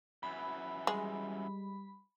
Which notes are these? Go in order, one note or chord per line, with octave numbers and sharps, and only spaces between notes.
F#2 E3 B5
G3 G#3